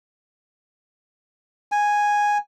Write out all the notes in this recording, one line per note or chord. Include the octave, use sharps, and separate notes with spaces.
G#5